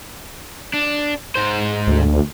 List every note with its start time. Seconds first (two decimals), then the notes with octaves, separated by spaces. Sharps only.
0.73 D4
1.35 G#2 C5
1.87 D2